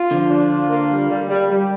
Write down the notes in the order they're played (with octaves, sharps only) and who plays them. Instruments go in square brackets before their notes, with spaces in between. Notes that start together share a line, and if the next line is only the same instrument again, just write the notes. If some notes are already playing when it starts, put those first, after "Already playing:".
Already playing: [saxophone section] F4
[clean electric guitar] D3 [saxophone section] F3
[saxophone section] D4
F4
A#3
G3
G3
G3
G3